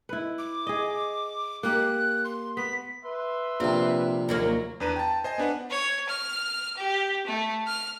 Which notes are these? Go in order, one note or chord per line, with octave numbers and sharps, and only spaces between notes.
E4 B4
D6
G#4 D#5
A#3 G4 F#6
C6
B3 B6
B4 E5 C6
A#1 C3 C4
D#2 F#3 A#3
E2 D4 B4 A#5 D#7
G5 A5
C5 D#5 G#5
B3 D4 B4 F#5
C#5
F6
G4
A3
F6